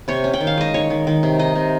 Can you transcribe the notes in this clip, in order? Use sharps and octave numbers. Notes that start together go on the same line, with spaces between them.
C3 C#5
C#4
G5
D#3
F5
G#3 D#5
D#3 C#5
D#3
D#3
C3
D#4 D#5
C3